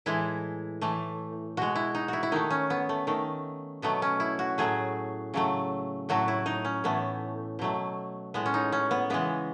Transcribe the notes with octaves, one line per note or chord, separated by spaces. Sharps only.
A2 E3 G#3 E4
A2 E3 A3
B2 G#3 F#4
E4
D#4
E4 F#4
E4
D#3 A3 D#4
C#4
B3
A3
D#3 A3
B2 F#3 A3 B3
C#4
E4
F#4
A2 F#3 A3 G#4
C#3 F#3 A3
A2 F#3 A3 F#4
E4
D#4
C#4
A2 E3 A3 B3
B2 F#3 A3
A2 G#3 B3
C#4
D#4
C#4
B3
C#3 E3 G#3 B3